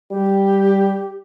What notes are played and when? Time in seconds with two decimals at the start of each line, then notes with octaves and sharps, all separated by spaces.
0.11 G3 G4